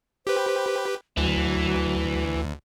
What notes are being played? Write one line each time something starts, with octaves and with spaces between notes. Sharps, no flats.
G4 B4 C5
D2 E3 F#3